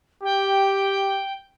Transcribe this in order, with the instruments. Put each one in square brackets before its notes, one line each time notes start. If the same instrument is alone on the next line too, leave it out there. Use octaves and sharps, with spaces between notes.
[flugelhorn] G4 [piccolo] G5